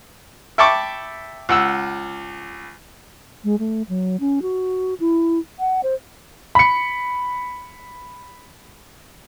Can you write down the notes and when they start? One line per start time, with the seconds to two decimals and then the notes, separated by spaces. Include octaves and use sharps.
0.58 E5 G5 A5 B5 C#6 D6
1.49 C#2 F#5 E6
3.44 G#3
3.59 A3
3.89 F#3
4.20 C#4
4.42 F#4
5.00 E4
5.59 F#5
5.83 C5
6.55 B5 C#7